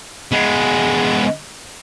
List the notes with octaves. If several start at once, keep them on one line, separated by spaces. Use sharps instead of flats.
G#3 B3